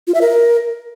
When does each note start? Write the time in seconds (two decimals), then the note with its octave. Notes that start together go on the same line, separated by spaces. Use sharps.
0.07 F4
0.14 E5
0.21 A#4